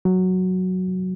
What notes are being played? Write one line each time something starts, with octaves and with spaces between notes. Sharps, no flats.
F#3